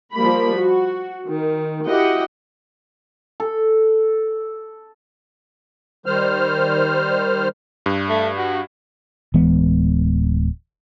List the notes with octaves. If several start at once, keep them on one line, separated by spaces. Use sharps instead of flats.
F3 G3 A#3 B5
F#4
D#3
E4 F#4 G4 D#5 F#5
A4
D#3 G3 C5 F6
G2
A3
F#4
D1 E3 G#3 B3